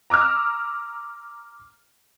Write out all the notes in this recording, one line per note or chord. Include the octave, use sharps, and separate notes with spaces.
A#5 D6 E6 F6